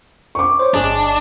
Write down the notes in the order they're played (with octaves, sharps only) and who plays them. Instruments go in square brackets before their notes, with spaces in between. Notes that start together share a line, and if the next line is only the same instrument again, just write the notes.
[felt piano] C#6 D6
[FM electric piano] C5 C#5
[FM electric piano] G1 G#4 D#5 [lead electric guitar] D4